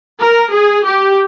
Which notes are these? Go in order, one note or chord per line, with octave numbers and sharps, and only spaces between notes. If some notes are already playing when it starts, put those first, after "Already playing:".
A#4
G#4
G4